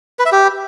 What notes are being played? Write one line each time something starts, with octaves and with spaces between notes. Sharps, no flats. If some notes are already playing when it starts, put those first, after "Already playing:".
B4
E5
G4